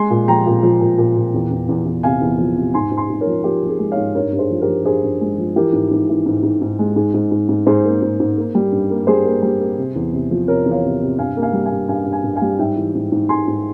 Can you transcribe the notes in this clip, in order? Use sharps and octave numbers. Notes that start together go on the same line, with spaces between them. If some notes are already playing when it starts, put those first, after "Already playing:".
Already playing: G#3 G#5 C6
A#2
F3 G5 A#5
A#2
F3
A#2
A#2
A#2
E2
E2
E2
E2
C3 F5 G#5
E2
F3
C3
G#2 G#5 C6
G#2
G#5 C6
G#2
A#4 C#5
F3
F3 G4 A#4
F3
G#4
G#3
C#5 F5
G#2
G2 A#4 C#5
G2
G#4 C5
F3
G4 A#4
F3
G2 G#4 C5
G2
G#3
F3
E3 G4 A#4
G#2
G#2
E3
G#2
G#2
G#2
G#3
G#2 G#4
G#2
G#2
G#2
G#2 G#4 C5
A#3
G#2
G#2
A#3
G3
G2
A#3
G3 G#4 C5
A#3
G3
A#3
C3
E2
C3
F3
C3 A#4 C#5
E2
C#5 F5
C3
C3
G2 F5 G#5
A#3
F5 G#5
G3
F5 G#5
G2
G2 F5 G#5
G2
F5 G#5
G2
F5 G#5
G3
G#2 E5 G5
E3
G#2
G#2
G#2 G#5 C6
G#2